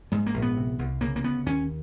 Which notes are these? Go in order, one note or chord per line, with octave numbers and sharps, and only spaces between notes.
G#2 G#3
A#3
A#1
B3
C3
C2
C#3 A#3
A#3
D2 B3
D#2 C#4